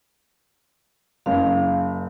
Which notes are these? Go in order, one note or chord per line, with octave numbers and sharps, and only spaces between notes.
F#1 F5